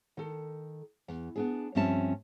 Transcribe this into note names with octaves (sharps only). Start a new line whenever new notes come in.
D#3 A4
E2
B3 D4 G#4
G2 F3 C4 C#4 E5 A5